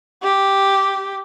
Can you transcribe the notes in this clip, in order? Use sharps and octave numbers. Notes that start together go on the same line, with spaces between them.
G4